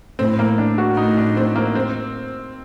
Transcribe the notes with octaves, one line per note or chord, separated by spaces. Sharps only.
A2 C4
A#3
D4
F#4
A2 D#4
D4
C4
A#3
C4